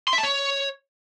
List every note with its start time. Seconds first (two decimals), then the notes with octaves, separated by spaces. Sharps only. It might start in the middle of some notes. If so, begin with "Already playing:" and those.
0.08 C6
0.13 E5
0.18 A5
0.23 C#5